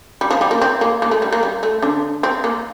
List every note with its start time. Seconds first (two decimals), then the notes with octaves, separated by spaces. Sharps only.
0.21 G3
0.31 F3
0.41 G3
0.51 A#3
0.62 C4
0.81 A#3
1.02 A#3
1.11 A3
1.22 G3
1.33 A#3
1.43 G3
1.63 A3
1.82 D3 D4
2.23 C4
2.44 A#3